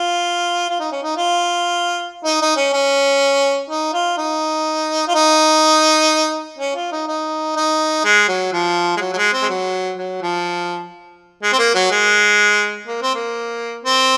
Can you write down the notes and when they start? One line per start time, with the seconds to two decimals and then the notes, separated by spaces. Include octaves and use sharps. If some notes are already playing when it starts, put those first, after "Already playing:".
Already playing: F4
0.70 F4
0.80 D#4
0.92 C#4
1.04 D#4
1.17 F4
2.25 D#4
2.42 D#4
2.57 C#4
2.73 C#4
3.70 D#4
3.94 F4
4.18 D#4
5.08 F4
5.15 D#4
6.59 C#4
6.76 F4
6.92 D#4
7.08 D#4
7.57 D#4
8.05 G#3
8.28 F#3
8.53 F3
8.97 G#3
9.01 F#3
9.13 F#3
9.18 G#3
9.33 C4
9.42 G#3
9.49 F#3
9.98 F#3
10.22 F3
11.43 G#3
11.53 C4
11.58 A#3
11.74 F#3
11.91 G#3
12.87 A#3
13.02 C4
13.14 A#3
13.84 C4